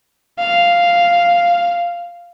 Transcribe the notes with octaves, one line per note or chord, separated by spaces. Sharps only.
F5